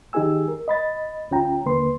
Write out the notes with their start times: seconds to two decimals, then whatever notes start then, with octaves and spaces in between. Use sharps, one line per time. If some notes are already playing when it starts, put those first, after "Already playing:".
0.13 D#3 D#4 G4 G#4 G#5 E6
0.48 A#4
0.68 D#5 B5 A6
1.31 D2 C#4 F4 G5 A#5
1.66 D#2 D3 A#3 B4 C6